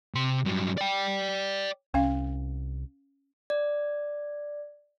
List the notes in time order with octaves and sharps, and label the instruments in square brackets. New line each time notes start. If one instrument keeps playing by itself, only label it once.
[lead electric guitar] C3 C6
G2 F#3
D5 G5
[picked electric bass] C2 [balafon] C#4 F5
[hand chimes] D5